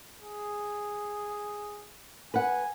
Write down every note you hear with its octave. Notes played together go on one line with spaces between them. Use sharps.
G#4
B4 F#5 G#5